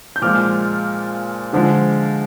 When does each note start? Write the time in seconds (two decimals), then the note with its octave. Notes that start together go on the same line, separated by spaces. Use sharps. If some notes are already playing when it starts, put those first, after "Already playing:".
0.16 G6
0.22 A#2 F3 G#3 D6 F6
1.53 D3 F3 G#3